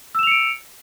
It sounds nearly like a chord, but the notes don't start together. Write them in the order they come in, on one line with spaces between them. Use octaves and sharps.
E6 E7 F7 C#7 D7